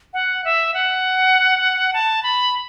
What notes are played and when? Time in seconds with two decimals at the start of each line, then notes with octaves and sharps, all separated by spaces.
0.13 F#5
0.44 E5
0.74 F#5
1.93 A5
2.23 B5